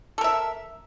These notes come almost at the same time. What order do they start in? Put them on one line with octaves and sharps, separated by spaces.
A4 A#4 E5